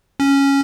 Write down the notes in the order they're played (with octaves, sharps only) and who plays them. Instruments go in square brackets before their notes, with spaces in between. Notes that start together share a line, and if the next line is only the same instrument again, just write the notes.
[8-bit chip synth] C#4